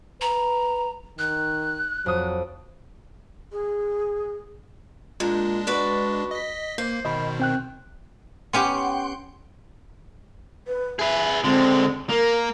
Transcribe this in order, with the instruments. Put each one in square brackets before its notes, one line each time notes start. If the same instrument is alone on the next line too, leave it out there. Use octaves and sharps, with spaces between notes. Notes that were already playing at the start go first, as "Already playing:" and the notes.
[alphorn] B4 [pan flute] A#5
[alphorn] D#3 [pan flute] F#6
[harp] F2 D#6 [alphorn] F#3
[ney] G#4
[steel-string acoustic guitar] A#2 [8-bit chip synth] G#3 D4
[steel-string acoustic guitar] F#4 B4 D5
[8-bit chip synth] D#5 B6
[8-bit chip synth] A#3 [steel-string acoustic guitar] C5
[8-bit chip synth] B2 D#3 [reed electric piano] D#5 B5
[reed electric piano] C4 G5 F#6
[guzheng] B3 C#4 G4 [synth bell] F#5 G5 C6
[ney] B4
[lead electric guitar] G#4 B4 [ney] E5
[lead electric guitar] D3 G#3 [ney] C4
[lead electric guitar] A#3 [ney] A#4